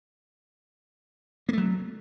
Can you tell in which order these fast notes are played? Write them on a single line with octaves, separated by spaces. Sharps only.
A#3 A3 F#3